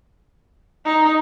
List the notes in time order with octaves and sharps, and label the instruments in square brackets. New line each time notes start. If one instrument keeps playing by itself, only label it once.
[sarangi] D#4